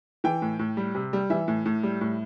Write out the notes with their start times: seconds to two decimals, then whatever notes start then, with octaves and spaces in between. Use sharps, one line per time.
0.24 E3 G5
0.42 A2
0.59 A2
0.77 G3
0.95 C3
1.13 G3
1.30 E3 E5
1.48 A2
1.66 A2
1.83 G3
2.01 A2